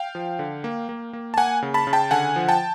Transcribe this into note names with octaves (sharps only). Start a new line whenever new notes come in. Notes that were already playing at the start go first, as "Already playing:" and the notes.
Already playing: F5 G5
F3
D3
A#3
A#3
A#3
A5
A#3 F#5 G#5
C#3
A5 B5
C#3
G5 A5
D3 F#5 G#5
F3
G5 A5